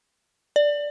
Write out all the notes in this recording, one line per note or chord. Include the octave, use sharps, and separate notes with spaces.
D5